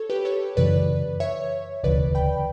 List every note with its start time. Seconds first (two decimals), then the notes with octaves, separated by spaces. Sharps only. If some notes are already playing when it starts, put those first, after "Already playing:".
Already playing: A4 C#5
0.10 G4 B4
0.25 A4 C#5
0.57 F#2 C#3 E3 B4 D5
1.20 C#5 E5
1.83 E1 D2 C#3 E3 B4 D5
2.15 G5 B5